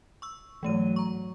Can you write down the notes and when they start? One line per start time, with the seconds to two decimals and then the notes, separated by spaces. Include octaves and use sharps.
0.22 C#6 E6
0.63 G#2 E3 F#3 A3 D#7
0.96 A#5 C#6